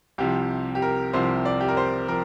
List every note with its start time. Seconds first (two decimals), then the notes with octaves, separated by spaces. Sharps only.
0.18 C2 C3 F3 G4
0.75 G4
0.82 A#4
1.13 C2 C3 F3 C5
1.45 D5
1.61 G4
1.68 A#4
1.77 C5
2.08 F3 A#4